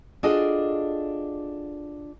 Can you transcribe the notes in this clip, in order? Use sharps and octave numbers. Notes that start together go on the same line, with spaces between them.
D4 F4 F#4 G#4 A4 D#5